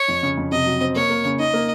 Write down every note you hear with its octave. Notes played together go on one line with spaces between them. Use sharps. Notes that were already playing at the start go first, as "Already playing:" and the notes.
Already playing: C#5
F2
C#3
F2
C3 D#5
F#3
C4
A#3 C#5
A#3
C#3
D#4 D#5
A#3